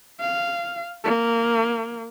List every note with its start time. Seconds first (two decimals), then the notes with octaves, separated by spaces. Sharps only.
0.21 F5
1.04 A#3